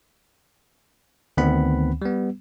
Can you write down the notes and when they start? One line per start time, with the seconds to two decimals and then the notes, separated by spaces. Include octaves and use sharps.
1.37 D2 D#3 B3 C4 F#5 B5
2.02 G3 B3